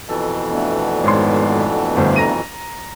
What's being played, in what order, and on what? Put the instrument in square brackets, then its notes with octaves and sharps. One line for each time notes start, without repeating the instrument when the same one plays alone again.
[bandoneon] F2 B2 E3 [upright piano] A4
[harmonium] A3 B3 D4
[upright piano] G#1 C#5 C6
G1 D2 C5
A#5 A#6 D#7